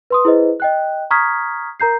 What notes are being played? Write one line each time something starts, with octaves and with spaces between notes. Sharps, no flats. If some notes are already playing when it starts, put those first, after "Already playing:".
B4 C6 D#6
E4 G#4 B4 C5 D#5
D#5 G5 F#6
A#5 C#6 D#6 F6 G#6 B6
A#4 A#5 G6 C7